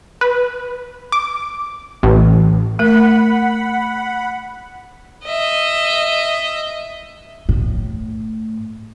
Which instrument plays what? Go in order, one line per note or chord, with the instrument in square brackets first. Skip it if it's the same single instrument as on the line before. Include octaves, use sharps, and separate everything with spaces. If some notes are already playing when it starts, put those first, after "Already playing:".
[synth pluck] B4
D6
A1
[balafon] A3 A#4 [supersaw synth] F#5 B5
[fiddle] D#5 E5
[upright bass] A2